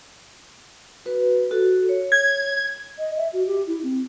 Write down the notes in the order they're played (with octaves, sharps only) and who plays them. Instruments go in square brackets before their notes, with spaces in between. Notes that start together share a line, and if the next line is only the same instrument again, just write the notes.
[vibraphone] F#4 B4
F#4 A4
C#5
[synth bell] G#6
[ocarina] D#5
E5
F#4
G4
E4
C4